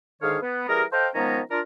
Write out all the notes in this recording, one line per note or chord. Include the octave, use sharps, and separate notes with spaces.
G#2 D3 D#3 G#4 C#5 F5
B3
E3 G3 G4 G#4 A#4
A4 C5 D#5 F5 G5
D#3 F3 G#3 B3 C#4 A#5
D4 F4 A#4